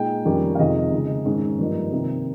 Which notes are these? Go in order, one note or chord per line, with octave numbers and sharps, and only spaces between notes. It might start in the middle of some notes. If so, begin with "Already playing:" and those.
Already playing: A#2 G#3 D#4 G5
F2 D#3 G3 A#3 C#4
F5
F2 C3 D#3 G#3 D#4 D#5
C#3 G#3 D#4
G#2 D#3 G#3 C#4
G2 F3 A#3 D#4
C3 D#3 A#3